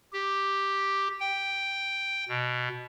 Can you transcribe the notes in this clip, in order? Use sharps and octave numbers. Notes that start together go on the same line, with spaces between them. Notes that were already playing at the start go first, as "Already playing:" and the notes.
G4
G5
B2